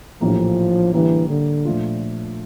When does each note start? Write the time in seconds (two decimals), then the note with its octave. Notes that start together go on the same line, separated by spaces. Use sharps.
0.21 A#1 A2 E3 F3 G3 A#3
0.94 D3 E3 G3 A#3
1.29 D3
1.65 A#2 F3 A3 D4 F4